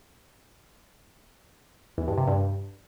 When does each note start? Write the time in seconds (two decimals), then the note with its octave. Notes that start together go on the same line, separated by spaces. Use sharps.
1.98 E2
2.08 G2
2.18 C3
2.27 G2